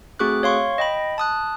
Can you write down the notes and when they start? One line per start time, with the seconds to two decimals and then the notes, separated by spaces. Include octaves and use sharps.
0.19 A3 C4 F#4 G#4 D6 F#6
0.43 C#5 F5 C6 C#6
0.78 D#5 G5 B5
1.18 A5 D#6 F#6